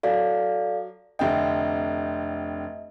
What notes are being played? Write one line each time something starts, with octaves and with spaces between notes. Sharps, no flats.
F#3 A4 D5 F5
F1 D3 D#5 E5 G5